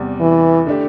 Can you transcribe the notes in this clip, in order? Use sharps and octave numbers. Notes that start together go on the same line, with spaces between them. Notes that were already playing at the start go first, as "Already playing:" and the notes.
Already playing: E2 C3 G3
E3
D3 A3 D4 G4